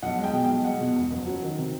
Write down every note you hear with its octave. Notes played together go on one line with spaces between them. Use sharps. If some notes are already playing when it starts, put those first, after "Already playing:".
B1 F#5
G#3
G5
B2
B1 G5
G#3 F#5
B2
E2
F#1
F#3
D#3
C3